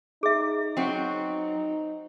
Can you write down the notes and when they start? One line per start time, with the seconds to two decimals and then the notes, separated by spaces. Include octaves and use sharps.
0.23 D#4 G#4 E5
0.77 F#3 C4 F#4